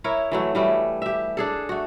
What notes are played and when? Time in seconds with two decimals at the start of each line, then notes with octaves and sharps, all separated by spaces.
0.04 E4 A#4 C#5
0.32 E3 F#3 A3
0.55 E3 G3 A3
1.02 G4 E5
1.37 D4 G#4 A4
1.69 A3 F#4